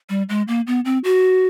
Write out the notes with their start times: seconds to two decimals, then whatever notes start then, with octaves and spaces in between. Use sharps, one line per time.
0.10 G3
0.29 G#3
0.48 A#3
0.67 B3
0.85 C4
1.04 F#4